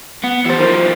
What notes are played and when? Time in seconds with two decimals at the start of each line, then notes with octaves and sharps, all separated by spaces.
0.23 B3 F#5
0.45 E3 G4 C5 A6
0.59 D#3 F3 F4 A#4 C5